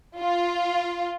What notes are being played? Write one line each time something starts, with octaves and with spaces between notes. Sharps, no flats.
F4